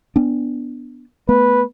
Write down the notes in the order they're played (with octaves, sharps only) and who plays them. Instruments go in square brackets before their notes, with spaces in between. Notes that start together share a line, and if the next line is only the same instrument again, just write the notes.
[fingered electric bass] B3 D4
[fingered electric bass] A3 B3 [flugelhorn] B4